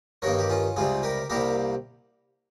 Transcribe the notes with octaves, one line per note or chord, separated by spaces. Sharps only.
G2 D#3 A#3 A#4 C#5
G4
C#4 F4
C#2 C3 G3 F4 G#4
G4 A#4
C2 C3 G3 A#3 G4 A#4